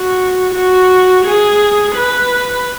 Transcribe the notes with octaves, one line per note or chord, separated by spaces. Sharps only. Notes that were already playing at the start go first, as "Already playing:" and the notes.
Already playing: F#4
F#4
G#4
B4